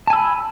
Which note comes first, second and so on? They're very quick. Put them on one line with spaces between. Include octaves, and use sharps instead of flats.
A5 G#5 E6 B5